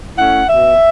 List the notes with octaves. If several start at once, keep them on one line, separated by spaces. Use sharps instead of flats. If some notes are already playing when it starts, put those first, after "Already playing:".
A3 C#4 E4 F#5
B2 E5